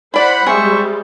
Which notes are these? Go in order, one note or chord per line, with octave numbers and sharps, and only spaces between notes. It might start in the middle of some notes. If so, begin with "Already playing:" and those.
E4 C5 D5 F#5 B5
G3 G#3 C4 G#4 C5 E5 C#6